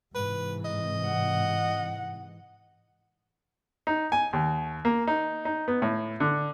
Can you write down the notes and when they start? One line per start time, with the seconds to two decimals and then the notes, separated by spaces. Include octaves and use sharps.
0.15 G#2 C3 E3 B4
0.64 D#5
1.05 F#5
3.87 D#4
4.12 G#5
4.33 D#2
4.85 A#3
5.07 D#4
5.45 D#4
5.68 B3
5.82 A2
6.20 D3